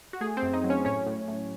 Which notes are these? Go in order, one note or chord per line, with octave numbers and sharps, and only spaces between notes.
F#4
A3 G#4
C4 C5
F#2
D#4 D#5
F#3
C#4 C#5
A2 C#4 C#5
A2
A2